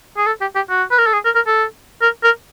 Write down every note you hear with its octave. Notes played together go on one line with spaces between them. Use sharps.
G#4
A4
G4
G4
F#4
B4
A#4
A4
G#4
A#4
A#4
A4
A#4
A#4